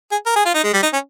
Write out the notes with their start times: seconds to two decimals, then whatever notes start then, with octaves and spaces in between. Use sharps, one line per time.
0.11 G#4
0.26 A#4
0.36 G#4
0.45 F4
0.54 D#4
0.64 G#3
0.73 G3
0.83 D#4
0.93 C#4